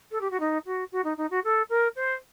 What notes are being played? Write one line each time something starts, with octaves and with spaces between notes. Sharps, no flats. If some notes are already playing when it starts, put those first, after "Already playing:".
A4
G4
F#4
D#4
F#4
F#4
D#4
D#4
F#4
A4
A#4
C5